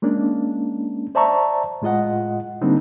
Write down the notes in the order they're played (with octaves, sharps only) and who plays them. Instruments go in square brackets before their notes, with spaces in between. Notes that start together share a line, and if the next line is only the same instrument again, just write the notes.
[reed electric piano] G#3 A#3 C#4 D4
C5 D5 E5 A5 A#5 C#6
A2 G#3 F4 D#5 F#5
D3 G3 A#3 C4 D4 D#4